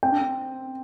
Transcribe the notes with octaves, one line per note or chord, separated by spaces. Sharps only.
C4 G5
D4
C4